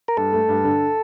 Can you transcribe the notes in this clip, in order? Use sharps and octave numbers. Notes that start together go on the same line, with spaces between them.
A#4
G2 A4
A3
G2
D3